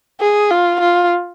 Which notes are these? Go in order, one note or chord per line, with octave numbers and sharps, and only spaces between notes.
G#4
F4
F4